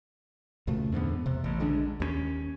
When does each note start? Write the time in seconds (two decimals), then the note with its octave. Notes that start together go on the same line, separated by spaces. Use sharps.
0.67 D2 A#2 C#3 A3
0.92 E2 G#2 D3 B3
1.26 E2 C3
1.44 A1
1.60 A#1 D3 G#3 D4
2.00 D#2 G3 C#4